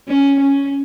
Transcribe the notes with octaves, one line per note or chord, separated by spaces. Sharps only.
C#4
C#4